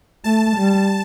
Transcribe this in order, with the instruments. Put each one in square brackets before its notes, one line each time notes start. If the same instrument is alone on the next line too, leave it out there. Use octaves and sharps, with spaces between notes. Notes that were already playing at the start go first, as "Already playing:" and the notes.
[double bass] A3 [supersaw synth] A5
[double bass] G3